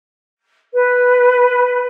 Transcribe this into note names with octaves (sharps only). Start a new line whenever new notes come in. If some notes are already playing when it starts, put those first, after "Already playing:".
B4